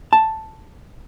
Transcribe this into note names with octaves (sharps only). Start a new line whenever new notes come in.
A5